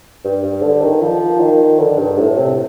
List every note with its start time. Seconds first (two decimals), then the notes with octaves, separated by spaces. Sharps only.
0.25 G2
0.44 G2
0.63 D3
0.82 D#3
1.02 F3
1.41 D#3
1.80 D3
1.99 G2
2.18 A2
2.38 C3